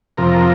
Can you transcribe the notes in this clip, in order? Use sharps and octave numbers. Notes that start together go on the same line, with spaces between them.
F2 C3 F3 A#4